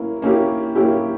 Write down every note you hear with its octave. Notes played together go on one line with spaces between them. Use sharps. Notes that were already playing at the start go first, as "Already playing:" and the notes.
Already playing: A#3 C#4 E4
A#3 C#4 E4 G4
A#3 C#4 E4 G4